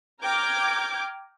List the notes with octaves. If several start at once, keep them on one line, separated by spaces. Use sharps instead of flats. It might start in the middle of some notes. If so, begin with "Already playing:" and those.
G5 A#5 D6 F6 G6 G#6